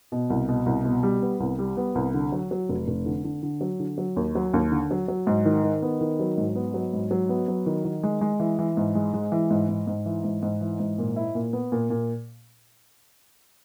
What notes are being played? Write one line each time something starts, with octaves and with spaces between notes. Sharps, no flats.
B2
C2
B2
C2
B2
G3
B3
C2
G3
B3
C2
D3
F#3
F#3
F1
F1
D3
D3
D3
F#3
D3
F#3
D#2
F#3
D#2
D3
F#3
F#3
G#2
D#3
D#3
B3
D#3
F#3
G#2
B3
F#3
G#2
F#3
B3
F#3
D#3
D#3
G#3
G#3
E3
E3
G#2
G#3
G#3
E3
G#2
G#2
G#2
E3
G#2
G#2
E3
G#2
A#2
E4
A#2
B3
A#2
A#2